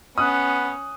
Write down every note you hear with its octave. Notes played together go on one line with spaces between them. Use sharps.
B3 C#4 D#6 F#6